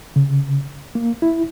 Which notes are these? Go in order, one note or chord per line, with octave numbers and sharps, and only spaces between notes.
C#3
A#3
E4